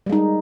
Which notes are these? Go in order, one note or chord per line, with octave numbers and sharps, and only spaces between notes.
G3 G#3 D#4